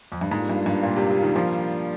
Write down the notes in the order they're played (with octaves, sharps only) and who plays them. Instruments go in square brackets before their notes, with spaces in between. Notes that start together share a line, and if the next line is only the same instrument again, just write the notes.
[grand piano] F2
G2
[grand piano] G#2 [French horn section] G3 A#3 D4 F4
[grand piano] G2
G2
A#2
C3
C3
D#3
F3